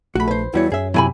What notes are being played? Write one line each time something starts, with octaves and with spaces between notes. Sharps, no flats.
A#1 A3 F#4 B5
B4 C5
E2 E3 G3 E4 F#4 C#5
F#2 G#4 C#5 E5
C3 E3 F#3 E4 G#5 B5